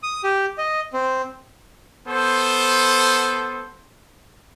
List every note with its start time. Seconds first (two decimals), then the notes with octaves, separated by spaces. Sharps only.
0.03 D#6
0.24 G4
0.58 D#5
0.93 C4
2.07 B3 A4 C5